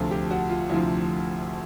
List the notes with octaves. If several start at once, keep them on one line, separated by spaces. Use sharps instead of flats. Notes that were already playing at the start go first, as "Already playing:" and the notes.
Already playing: D2 C3 F3 A4
G4
F#4
F4
D2 C3 F3 E4